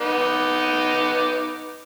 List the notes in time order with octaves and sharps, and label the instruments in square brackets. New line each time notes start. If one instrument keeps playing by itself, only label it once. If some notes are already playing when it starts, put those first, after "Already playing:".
[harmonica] B3 D#4 D6